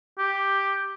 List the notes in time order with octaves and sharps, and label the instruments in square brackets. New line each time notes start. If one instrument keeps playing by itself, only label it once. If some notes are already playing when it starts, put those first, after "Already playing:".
[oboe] G4